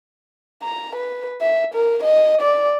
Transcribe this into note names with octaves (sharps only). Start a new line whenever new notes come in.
A#5
B4
E5
A#4
D#5
D5